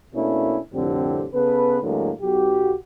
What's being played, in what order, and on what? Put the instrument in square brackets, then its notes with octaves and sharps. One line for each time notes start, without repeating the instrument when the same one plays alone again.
[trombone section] B2 A3 A#3 C#4 D4 E4
C2 F2 A2 D3 C4 G4
C#3 B3 A4 B4
A2 D3 E3 F#3 G#3 A#3
B1 F#4 G4